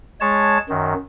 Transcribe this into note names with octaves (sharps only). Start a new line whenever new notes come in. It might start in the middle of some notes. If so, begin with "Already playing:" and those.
G#3 C#5 A5
F#2 D#3